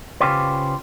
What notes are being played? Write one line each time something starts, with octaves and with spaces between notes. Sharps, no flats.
C#3 C#4 F4 G4 B4 C5